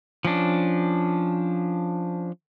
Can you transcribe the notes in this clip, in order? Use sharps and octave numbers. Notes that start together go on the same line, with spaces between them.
F3 C#4 D4